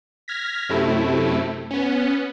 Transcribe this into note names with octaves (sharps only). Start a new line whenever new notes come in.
F6 G#6 A#6 B6
F#2 C3 A3 E4
B3 C#4